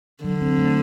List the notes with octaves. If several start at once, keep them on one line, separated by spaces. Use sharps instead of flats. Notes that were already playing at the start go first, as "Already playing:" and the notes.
D3 F#3
C4
A3